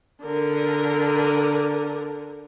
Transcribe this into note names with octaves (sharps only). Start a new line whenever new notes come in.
D3 A#4